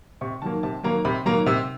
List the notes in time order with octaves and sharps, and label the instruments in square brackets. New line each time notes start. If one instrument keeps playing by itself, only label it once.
[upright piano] C3 C#6
D#3 F#3 A#3 A5
C3 A5
D#3 F#3 A#3 A#5
C3 B5
D#3 F#3 A#3 A#5
C3 E6